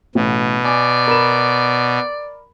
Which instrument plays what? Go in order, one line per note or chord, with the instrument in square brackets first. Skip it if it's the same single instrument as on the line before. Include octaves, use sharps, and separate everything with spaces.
[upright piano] A1 [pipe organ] B2
[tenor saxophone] D5 [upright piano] G#5
[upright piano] A#4 B5 E7